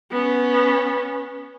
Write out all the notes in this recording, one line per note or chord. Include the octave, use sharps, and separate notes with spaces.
B3 C#4